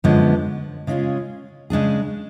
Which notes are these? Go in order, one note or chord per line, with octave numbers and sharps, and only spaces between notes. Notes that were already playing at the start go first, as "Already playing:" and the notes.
F#2 D3 F3 G#3 B3
C#3 G#3 C#4 F4 G#4
C#3 G#3 D4 G#4